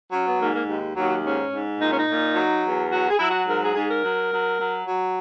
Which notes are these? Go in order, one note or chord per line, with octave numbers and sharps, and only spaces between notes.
F#3 C#4
B3
G#2 A#3
A#3
D#2 G#3
D#2 F#3
G#2 C#4
G#2
A#2 D#4
C#4
D#4
A#2
F#3
E2
F#3 F#4
G#4
F#3 E4
F#4
G#2 A#4
G#4
G#2 G#4
A#4
F#3
F#3
F#3
F#3